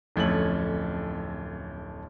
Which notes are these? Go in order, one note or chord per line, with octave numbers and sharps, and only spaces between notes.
D1 F2 A3 C#4 F#7